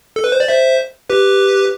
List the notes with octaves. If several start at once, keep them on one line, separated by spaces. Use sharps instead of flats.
A4
B4
C5
D5
C5 E5
G4 B4